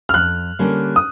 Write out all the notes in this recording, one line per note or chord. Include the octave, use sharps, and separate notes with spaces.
F6
F2 F#6
D3 G3 A#3 C#4
D#6